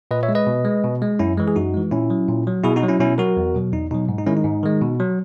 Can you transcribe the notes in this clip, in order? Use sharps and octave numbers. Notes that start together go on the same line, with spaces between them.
A#2 B4 D#5
C#5 E5
G#3
B4 D#5
B2
G#3
B2
G#3
F#2 C#4 E4
E3 G#3
G#4
F#2 D#4 F#4
E3 G#3
A#2 C#4 E4
F#3
A#2
F#3
B2 E4 G#4
D#4 F#4
F#3
C#4 E4
B2 C#4 E4
F#3 F#4 A#4
E2
B2 F#3
E2 D#4
B2 F#3 D#4
G#2
D#4
D#3 G#3 C#4 E4
D#4
G#2
D#3 G#3
B2
F#3